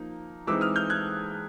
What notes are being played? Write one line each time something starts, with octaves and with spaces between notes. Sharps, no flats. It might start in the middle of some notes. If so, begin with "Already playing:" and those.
Already playing: F3 A#3 D#4
E3 G#3 C4 D#4 D6 E6
D#6 F6
F6 G6
F#6 G#6